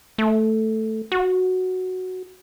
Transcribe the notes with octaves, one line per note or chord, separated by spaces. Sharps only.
A3
F#4